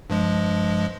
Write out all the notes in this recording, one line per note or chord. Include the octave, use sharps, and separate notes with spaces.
G2 F3 G#3